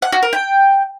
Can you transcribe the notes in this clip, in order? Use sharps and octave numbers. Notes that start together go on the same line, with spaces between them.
F#5
F#4
A#4
G5